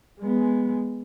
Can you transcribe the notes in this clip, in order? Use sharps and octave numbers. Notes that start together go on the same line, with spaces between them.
G#3 B3